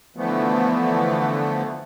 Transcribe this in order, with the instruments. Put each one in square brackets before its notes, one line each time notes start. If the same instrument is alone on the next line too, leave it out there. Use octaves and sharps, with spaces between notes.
[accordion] D3 E3 F3 A3 B3